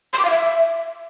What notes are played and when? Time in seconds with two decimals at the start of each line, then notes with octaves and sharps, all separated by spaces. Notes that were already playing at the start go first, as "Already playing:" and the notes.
0.13 C6
0.19 D6
0.25 F5
0.30 E5